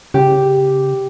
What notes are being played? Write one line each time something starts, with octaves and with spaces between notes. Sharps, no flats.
C#3 G4